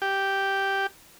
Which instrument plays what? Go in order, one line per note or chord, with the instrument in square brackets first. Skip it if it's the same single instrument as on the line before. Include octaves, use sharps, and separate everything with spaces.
[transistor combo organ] G4